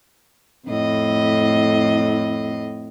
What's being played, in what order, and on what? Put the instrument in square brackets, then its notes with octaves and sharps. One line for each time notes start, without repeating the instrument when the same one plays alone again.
[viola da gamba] F2 A2 D#5